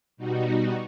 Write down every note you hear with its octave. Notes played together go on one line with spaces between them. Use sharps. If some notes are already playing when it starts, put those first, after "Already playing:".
B2 G3 D#4 F#4